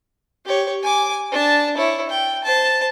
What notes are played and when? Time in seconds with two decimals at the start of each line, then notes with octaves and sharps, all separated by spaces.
0.45 G4 C#5
0.82 G#5 D6
1.32 D4 A5
1.77 E4 C#5
2.10 G5
2.44 C5 A5